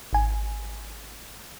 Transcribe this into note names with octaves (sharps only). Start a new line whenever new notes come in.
G#1 G#5